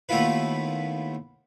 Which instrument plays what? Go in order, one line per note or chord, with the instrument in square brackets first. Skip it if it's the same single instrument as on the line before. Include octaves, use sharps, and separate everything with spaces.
[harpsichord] D#2 A3 B3 E4 F4 B4